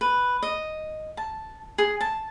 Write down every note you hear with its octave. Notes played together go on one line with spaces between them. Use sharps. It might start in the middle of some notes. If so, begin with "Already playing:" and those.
B4
D#5
A5
G#4
A5